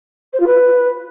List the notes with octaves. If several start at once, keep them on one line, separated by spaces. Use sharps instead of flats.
C5
F4
B4